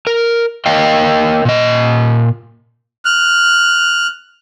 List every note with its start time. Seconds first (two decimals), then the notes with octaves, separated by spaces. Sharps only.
0.07 A#4
0.66 A#3 A#4 C#5 D#5 F5 G5
1.45 A#2 D#5
3.05 F6 F#6